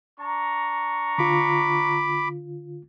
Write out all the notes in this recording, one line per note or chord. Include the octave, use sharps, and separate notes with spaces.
D4 A#5 C#6
D3 F4 B5 D6